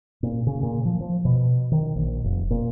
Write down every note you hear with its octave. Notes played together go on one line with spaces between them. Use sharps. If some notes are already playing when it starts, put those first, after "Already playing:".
A#2
C#3
A#2
F3
F3
B2
D#3
A#1
F1
A#2